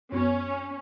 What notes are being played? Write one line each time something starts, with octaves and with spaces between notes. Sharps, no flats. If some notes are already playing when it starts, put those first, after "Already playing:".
F#2 B3 C#4